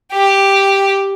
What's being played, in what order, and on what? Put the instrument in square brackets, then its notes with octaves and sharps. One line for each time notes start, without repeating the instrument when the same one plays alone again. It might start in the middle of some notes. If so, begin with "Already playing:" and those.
[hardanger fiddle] G4